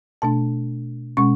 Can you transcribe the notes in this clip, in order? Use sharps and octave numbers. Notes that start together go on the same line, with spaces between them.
B2 A3 D4 A5
B2 G#3 C#4 C#6